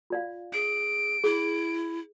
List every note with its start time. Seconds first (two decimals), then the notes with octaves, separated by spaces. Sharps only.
0.10 F4 D5 F5
0.53 G#4 D7
1.24 E4 G#4